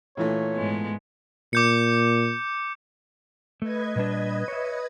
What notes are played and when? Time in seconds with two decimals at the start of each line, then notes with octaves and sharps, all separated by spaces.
0.17 A#2 E3 A3 C#5
0.54 G#2 G#3 B3
1.53 A#2 D6 G6 C#7
3.62 A3 B4 D#5 G#6
3.96 A#2 G3 D4
4.48 C#5 E5